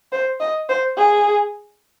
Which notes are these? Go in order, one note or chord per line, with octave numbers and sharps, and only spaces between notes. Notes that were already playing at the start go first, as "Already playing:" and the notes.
C5
D#5
C5
G#4